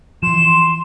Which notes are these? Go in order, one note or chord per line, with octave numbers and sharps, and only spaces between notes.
E3 F3 C6 E7